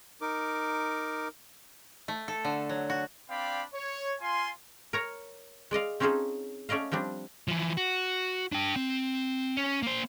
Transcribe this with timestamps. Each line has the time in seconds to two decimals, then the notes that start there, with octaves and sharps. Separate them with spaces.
0.21 D#4 A#4 D6
2.08 A3
2.28 A4
2.45 D3
2.69 F#3
2.90 F#4
3.30 C4 D4 D5 F5 G5 B5
3.75 C#5
4.21 F4 G#5 C6
4.93 A#4 C#5 A#5
5.71 G#3 D5 D#5 F5
6.00 C4 C#4 D#4 F4 G#4 A4
6.69 A3 C#4 D5 D#5 F5
6.92 F3 G3 C4 D4
7.48 E3 F3
7.77 F#4
8.52 D4 G5
8.76 C4
9.57 C#4
9.82 A#3 C5